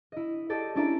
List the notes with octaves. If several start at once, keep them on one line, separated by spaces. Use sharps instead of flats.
E4 D#5
G4 A4 D5 D#5
C#4 D4 E4 D5 E5 A#5